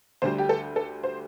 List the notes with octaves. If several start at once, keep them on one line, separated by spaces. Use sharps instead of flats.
D2 D3 G3 C5
G4
A4
A4
C5